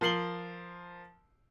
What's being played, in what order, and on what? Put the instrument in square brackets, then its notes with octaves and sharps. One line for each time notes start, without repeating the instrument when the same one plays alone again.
[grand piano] F3 A#4 C7 F#7 G7